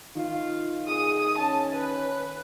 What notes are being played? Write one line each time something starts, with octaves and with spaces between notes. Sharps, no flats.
D#3 F4
G#4 D#6
C#4 A5
B4